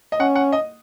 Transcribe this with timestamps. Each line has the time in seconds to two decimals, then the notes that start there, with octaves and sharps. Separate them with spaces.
0.12 D#5
0.20 C#4 F#5
0.35 F#5
0.52 D#5